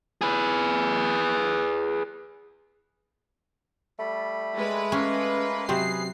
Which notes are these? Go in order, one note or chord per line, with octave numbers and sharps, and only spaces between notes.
G#4 B4
G3 A3 B5
G#3 B4
A#3 C#4 A#4 C6
C3 F#3 C4 G#4 B4 C7